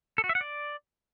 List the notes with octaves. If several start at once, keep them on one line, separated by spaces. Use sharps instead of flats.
A4
F#4
E5
F#5
D5